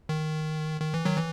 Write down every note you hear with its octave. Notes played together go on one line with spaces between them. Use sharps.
D#3
D#3
E3
D#3 F#3
E3